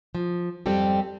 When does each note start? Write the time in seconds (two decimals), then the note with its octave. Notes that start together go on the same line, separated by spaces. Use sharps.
0.15 F3
0.66 F2 G#2 G3 C4 G4 A4